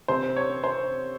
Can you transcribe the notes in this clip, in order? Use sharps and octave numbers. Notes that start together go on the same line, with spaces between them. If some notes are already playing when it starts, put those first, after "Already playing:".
C3 C5
C#5
C4
C5